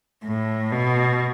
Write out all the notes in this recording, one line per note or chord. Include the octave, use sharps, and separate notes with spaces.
A2
B2